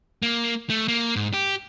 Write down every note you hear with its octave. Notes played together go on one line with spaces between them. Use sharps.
A#3
A3
A#3
G#2
G4